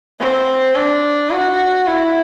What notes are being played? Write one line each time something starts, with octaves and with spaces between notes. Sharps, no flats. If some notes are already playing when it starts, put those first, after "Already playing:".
C4
D4
F#4
E4